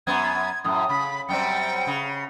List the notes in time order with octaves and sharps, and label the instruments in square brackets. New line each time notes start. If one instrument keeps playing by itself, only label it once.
[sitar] F#2 B3 [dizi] G#6
[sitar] F#2 A2 [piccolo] D#6
[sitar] C#3 [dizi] B5
[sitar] F#2 G3 C4 [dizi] G5 [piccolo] C#7
[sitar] C#3